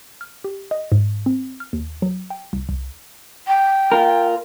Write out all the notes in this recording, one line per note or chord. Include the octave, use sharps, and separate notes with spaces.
F6
G4
D#5
G#2
C4
F6
D#2
F#3
G5
C2
C2
G5
F4 A#4